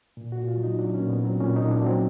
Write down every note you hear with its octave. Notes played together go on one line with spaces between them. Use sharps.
A#2
F#4
A#2
F4
F#3
D#4
F#3 D4
A#2 C#4
B3
F#3
C4
A#2 C#4
A#2 D#4
D4
F#3
C4